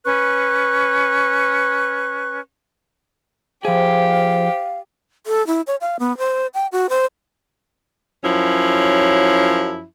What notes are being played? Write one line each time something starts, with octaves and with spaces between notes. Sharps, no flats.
C#4 B4 C#6 F#6
F3 G4 G#4 C5 F5
A4
E4
C#5
F5
B3
C5
G5
F#4
C5
F#2 F3 F#3 C#4 E4